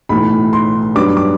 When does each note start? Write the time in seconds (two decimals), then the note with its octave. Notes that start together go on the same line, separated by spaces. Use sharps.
0.09 B1 A2 E3 B5
0.53 C6
0.95 G2 F#3 B3 D4 D6
1.17 D6